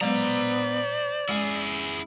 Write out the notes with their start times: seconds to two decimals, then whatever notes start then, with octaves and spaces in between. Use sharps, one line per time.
0.01 F#3 G#3 B3 C5 D5 F5 A#5
1.29 G#3 C#4 E4 G#4